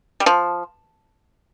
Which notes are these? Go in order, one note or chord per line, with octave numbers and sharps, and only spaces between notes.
G3
F3